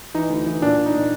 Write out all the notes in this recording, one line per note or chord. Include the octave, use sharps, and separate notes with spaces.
E3 D#4
D2
E3
A#2 D4
A#2
D#4
A#2